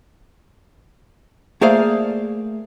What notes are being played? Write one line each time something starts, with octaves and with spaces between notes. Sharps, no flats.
A3 A#3 G#4 C5 D5 F5